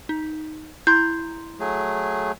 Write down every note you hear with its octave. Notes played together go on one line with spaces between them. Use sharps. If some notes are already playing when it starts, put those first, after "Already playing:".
D#4
E4 A#5 C6 G6
F#3 A3 G#4